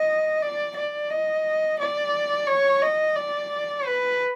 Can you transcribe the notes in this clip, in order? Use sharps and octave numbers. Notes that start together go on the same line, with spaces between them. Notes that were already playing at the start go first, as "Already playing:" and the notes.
Already playing: D#5
D5
D5
D#5
D5
C#5
D#5
D5
B4